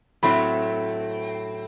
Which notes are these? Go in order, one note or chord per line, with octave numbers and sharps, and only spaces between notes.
A2 F#3 A3 C4 B5